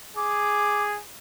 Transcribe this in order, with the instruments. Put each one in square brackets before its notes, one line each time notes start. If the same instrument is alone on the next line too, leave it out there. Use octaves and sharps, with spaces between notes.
[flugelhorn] G#4 [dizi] D6